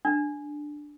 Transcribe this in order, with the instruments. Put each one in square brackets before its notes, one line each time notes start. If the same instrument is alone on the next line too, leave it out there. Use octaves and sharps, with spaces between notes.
[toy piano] D4